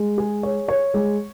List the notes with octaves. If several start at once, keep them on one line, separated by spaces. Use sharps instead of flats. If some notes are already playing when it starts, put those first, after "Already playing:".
Already playing: G#3
G#4
C#5
C#5
G#3